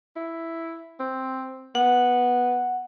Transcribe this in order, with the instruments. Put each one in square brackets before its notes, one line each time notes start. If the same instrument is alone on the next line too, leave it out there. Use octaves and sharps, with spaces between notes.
[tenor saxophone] E4
C4
[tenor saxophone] B3 [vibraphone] F#5